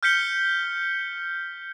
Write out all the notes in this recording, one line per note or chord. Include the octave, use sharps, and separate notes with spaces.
F6 G6 B6 C#7 G7